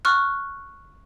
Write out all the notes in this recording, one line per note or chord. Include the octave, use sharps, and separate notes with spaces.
C#6 F6 F#6